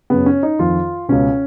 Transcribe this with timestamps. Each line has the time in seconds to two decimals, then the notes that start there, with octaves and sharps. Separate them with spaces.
0.10 F#2 C#3 B3
0.26 C#4
0.43 D#4
0.59 F2 D#3 F4
1.09 C#2 B2 C#4